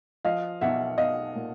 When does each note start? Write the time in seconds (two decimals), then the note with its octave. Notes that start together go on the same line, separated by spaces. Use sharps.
0.25 F3 D#5 F5
0.61 B1 E5 F#5
0.98 B1 D#5 F5
1.35 A#2